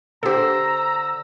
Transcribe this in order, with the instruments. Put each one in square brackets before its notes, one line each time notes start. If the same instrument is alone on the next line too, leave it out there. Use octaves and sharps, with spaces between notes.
[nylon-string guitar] D3 C5 [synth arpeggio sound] G4 A4 [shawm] A#5 [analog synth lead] E6